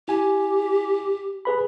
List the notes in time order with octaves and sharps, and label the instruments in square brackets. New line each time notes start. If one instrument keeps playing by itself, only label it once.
[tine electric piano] E4 G#5 [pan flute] G4
[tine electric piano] G#4 B4 B5